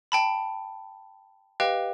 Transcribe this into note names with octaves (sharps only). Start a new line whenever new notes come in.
G5 A5 B5
G4 B4 D#5 F5 G5